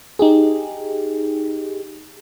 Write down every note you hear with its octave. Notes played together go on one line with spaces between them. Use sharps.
D#4 G4 G#4